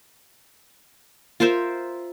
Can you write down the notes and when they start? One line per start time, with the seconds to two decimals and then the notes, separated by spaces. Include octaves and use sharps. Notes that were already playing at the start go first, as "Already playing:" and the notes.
1.40 F4 A#4 C5 E5